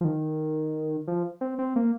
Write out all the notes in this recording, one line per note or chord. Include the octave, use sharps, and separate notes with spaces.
F3
D#3
F3
C4
C4
A#3